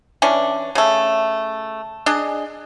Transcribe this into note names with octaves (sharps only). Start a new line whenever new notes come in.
E3 C#4 D4
C#3 A3
D4 G#4 D#5